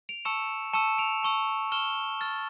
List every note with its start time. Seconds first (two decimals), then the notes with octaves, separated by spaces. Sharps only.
0.09 D7 F7
0.25 A5 C#6 E6 C#7 E7
0.73 A5 C#6 E6 C#7 E7
0.98 D7 F7
1.23 A5 C#6 E6
1.72 C#6 F6 E7 G7
2.21 C#6 F6 A6